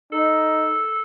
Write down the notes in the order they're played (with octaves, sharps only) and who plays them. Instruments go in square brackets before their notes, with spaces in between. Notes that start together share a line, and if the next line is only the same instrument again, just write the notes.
[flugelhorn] D#4 [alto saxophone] A4